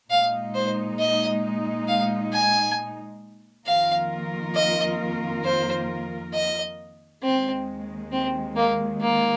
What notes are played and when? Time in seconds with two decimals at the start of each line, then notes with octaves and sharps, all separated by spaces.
0.10 A#2 G#3 D#4 F5
0.55 C5
0.99 D#5
1.88 F5
2.33 G#5
3.66 F2 D#3 A#3 F4 A#4 F5
4.55 D#5
5.44 C5
6.34 D#5
7.23 D#2 D#3 G#3 C4
8.12 C4
8.56 A#3
9.01 A#3